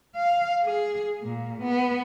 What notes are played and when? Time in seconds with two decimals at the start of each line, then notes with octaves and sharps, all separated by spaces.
0.15 F5
0.63 G#4
1.23 A#2
1.62 B3